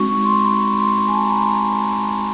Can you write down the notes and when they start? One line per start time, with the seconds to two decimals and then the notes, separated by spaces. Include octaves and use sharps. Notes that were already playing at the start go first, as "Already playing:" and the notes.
Already playing: G#3 C4 D#4 F#4 C#6
0.25 C6
0.44 B5
0.62 B5
0.80 C6
1.08 G#5
1.15 A5
1.22 A#5
1.30 B5
1.38 C6